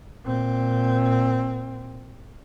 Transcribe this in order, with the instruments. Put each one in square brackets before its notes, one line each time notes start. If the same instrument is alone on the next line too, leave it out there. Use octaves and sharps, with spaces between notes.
[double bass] A#2 C4